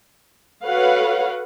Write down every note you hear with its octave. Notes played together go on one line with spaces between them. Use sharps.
F#4 A4 B4 C#5 F5 F#5